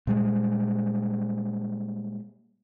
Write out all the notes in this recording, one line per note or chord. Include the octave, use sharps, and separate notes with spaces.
A#2 G3 G#3